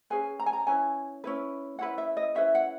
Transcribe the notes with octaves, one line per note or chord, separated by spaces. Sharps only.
C#4 G#4 B4 G#5
A#5
G#5
A#5
C#4 E4 B4 G#5
C#4 E4 B4
C#4 E4 B4 F#5
E5
D#5
C#4 E4 B4 E5
F#5